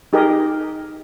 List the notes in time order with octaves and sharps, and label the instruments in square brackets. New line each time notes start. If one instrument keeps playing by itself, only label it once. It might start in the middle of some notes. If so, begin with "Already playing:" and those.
[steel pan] D#4 G4 G#4 A#4 D#5